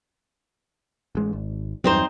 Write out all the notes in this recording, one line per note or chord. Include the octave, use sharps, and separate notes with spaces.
A1 G#3
G#1
E2 G2 F#3 C4 D#4 C5